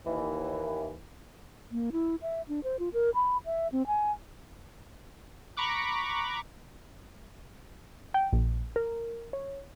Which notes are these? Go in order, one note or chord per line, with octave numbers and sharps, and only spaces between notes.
D#2 E3
A#3
E4
E5
D4
C5
F4
A#4
B5
E5
C4
G#5
A#5 B5 C#6 D6 F#6
G5
A#1
A#4
C#5